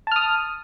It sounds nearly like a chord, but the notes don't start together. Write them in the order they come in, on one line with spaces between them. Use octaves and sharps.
A5 F6 D#6